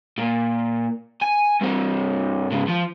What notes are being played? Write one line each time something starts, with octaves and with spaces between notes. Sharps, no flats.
A#2
G#5
G2 C4
G#2 C#3
F3